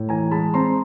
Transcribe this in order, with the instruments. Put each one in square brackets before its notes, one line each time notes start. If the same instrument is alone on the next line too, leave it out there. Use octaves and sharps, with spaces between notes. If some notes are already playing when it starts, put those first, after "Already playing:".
Already playing: [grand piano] A2
E3 G#5 A#5
G#3 A5 B5
C4 A#5 C6